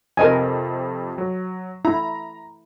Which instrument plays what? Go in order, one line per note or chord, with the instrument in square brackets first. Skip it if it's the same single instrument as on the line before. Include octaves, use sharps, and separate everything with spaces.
[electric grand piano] F2 C3 [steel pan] A#4 D#5 G#5
[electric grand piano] F#3
[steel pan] E4 [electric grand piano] A#5